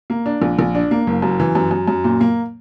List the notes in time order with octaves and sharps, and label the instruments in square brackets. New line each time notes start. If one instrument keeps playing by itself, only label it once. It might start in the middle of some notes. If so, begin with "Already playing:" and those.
[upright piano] A#3
D4
A#1
A#1
D4
A#3
F#1
F#2
E3
F#2
F#2
F#2
A#2
A#3